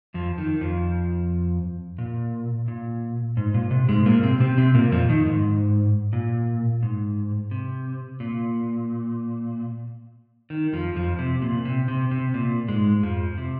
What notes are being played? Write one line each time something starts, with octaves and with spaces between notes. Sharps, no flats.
F2 F3
D#3
F2 F3
A#2
A#2
G#2
A#2
C3
G#2 G#3
A#2 A#3
C3 C4
C3 C4
C3 C4
A#2 A#3
F2 F3
D#3
G#2
A#2
G#2
C3
A#2
D#3
F2 F3
F2 F3
C3
A#2
C3
C3
C3
A#2
G#2 G#3
F2 F3
C3